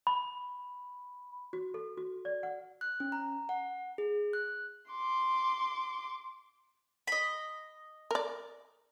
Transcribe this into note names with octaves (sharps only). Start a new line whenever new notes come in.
B5
F#4
A4
F#4
D5
F#5
F#6
C#4
A#5
F#5
G#4
F#6
C6 D6
D#5 B5
A#4 D5